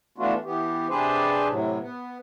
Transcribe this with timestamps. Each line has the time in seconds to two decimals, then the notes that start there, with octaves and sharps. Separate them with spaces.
0.18 E3 A3 B3 D4 F4 F#4
0.44 E3 B3 G4
0.89 C3 D4 G4 G#4 B4 C5
1.49 A2 C3 F#3
1.80 B3